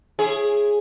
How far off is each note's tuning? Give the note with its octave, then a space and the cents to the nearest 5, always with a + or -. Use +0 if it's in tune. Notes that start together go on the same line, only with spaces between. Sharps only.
E4 +20 G#4 +0 C#5 -25